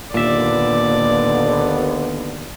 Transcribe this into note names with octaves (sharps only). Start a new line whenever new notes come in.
D#2 A#2 D3 B3 D5 E5